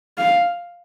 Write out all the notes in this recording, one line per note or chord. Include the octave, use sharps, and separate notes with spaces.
F5